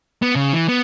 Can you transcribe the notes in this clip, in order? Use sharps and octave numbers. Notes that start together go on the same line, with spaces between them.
B3
C#3
E3
B3